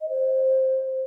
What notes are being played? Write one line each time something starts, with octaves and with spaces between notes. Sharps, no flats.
D#5
C5